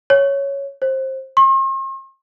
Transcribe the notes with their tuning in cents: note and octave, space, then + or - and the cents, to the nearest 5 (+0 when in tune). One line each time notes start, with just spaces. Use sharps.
C#5 +0
C5 +20
C6 +45